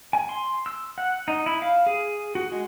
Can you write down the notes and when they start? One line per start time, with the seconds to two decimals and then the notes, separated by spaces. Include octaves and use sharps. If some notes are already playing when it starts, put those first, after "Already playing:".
0.13 G#5
0.29 C6
0.66 E6
0.98 F#5
1.28 D#4
1.46 E4
1.62 F5
1.86 G#4
2.35 F#4
2.52 G#3